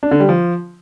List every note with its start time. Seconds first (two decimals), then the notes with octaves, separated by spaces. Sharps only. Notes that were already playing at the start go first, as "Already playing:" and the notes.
0.03 D4
0.11 D3
0.20 G3
0.29 F3